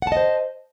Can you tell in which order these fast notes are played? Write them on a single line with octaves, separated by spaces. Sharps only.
F#5 A5 D#5 C5